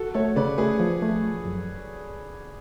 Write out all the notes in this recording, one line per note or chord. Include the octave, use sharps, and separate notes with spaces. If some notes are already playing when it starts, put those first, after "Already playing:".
Already playing: F#4 A4
A3 A4 C#5
C#3 B4 D5
A3 G#4 B4
F3
A3
F3
F#2